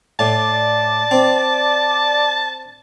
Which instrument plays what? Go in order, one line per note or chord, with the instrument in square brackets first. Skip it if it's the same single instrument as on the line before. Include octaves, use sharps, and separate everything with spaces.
[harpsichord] A2 [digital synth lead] D5 [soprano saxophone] A5
[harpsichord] C4